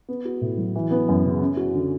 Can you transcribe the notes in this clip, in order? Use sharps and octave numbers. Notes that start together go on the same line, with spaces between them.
B3
F#4
A2
F#3
E3
B3
F#2
C#3
C#4
F#4
D3